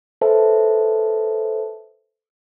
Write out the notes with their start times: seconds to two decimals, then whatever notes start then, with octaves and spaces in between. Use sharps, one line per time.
0.21 A4 B4 C5 E5 A5